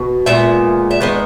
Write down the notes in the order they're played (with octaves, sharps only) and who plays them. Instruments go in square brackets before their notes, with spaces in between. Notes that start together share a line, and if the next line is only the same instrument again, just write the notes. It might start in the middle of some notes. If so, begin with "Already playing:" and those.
Already playing: [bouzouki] B2
A#2 G#3 B3 E5
E5
D#3 G#3 B3 B4 D#5